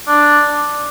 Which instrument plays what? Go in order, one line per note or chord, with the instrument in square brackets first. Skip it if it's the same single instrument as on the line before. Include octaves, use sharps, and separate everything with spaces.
[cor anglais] D4